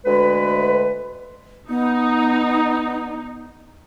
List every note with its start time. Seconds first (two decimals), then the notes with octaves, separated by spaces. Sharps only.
0.06 D2 G#3 B4
1.69 B3 D#4